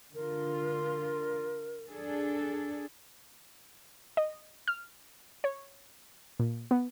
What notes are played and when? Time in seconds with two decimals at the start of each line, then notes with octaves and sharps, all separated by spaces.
0.15 D3 F4 A#4
1.87 D4 G#4 A4
4.17 D#5
4.68 F6
5.44 C#5
6.40 A#2
6.71 B3